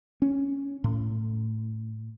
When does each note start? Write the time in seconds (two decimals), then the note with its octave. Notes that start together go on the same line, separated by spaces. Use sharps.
0.22 C#4
0.84 A2